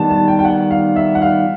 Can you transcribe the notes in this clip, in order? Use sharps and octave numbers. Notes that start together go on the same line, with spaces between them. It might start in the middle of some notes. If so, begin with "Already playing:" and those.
Already playing: D#3 G3 B3 A5
A5
G5
G5
F#5
F5
E5
F#5
F5